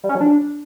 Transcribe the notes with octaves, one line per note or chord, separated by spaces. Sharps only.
G3
C#4
F#3
D4